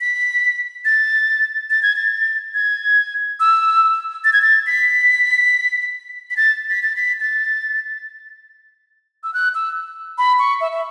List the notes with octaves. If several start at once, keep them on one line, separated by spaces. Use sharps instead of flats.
B6
A6
A6
G#6
A6
G#6
E6
A6
G#6
A6
B6
B6
A6
B6
A6
B6
A6
E6
F#6
E6
B5
C#6
E5
E5